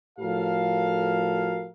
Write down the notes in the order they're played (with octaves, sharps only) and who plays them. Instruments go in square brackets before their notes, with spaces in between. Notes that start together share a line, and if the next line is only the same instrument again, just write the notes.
[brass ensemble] A2 F3 F#4 A4 A#4 F5